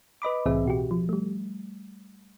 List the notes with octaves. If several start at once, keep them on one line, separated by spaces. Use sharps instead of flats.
B4 D#5 B5 D6
C2 A2 E3 C4 G#4 E5
B2 F#4 G4
F3
G3 A3